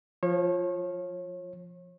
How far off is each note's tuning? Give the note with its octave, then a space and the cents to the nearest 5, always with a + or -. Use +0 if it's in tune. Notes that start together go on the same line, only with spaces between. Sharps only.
F3 +0 C#5 -35